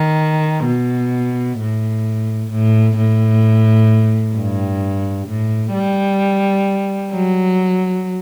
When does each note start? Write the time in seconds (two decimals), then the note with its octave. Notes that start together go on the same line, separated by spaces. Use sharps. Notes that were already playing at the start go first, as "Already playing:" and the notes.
Already playing: D#3
0.67 B2
1.60 A2
2.51 A2
2.97 A2
4.36 G2
5.28 A2
5.74 G3
7.12 F#3